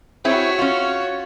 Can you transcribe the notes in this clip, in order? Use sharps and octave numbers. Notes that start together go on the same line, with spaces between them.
C4 E4 F#4 G#4 C#5
C#4 F4